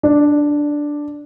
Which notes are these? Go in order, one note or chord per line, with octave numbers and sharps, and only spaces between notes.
D4